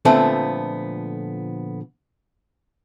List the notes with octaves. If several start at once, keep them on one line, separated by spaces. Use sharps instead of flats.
A#2 D3 F3 A3 B3 C4